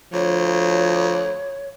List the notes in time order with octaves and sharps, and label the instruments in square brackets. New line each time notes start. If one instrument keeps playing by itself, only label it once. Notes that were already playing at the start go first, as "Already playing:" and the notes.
[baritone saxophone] D2 [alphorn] F3 [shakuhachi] C#5